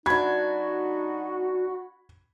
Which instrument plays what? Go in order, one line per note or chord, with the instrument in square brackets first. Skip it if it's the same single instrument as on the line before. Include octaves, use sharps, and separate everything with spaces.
[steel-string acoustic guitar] F#2 D4 [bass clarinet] D#4 [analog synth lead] F#4 [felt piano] B5 G#6